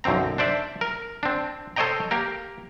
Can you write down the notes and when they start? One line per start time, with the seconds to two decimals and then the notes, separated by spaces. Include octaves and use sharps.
0.04 B1 F#2 D3 C4 A#5
0.38 D4 C5 D5 E5
0.81 A#4
1.23 C4 D4
1.76 A4 C5 C#5 D#5 G5 A#5
2.11 A#3 G4 A#4